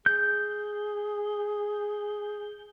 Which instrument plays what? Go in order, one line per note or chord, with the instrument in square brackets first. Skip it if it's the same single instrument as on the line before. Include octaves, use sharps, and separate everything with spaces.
[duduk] G#4 [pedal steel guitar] G6